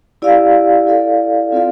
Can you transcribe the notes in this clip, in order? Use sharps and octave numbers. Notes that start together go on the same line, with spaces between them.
E4 G4 D5 F5
E4 A4 D5 F5
C4 F4 A4 D5 F5